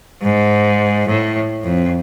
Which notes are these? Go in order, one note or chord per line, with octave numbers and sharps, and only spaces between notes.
G#2
A2
F2